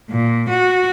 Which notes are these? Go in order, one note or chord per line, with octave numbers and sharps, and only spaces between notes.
A#2
F#4